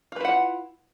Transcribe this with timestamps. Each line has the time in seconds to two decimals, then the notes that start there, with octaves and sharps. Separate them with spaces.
0.12 F4
0.16 B4
0.20 E4
0.25 F#5